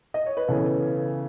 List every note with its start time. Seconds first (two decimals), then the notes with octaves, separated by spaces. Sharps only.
0.14 D#5
0.26 C#5
0.37 B4
0.48 C#3 E3 B3 A4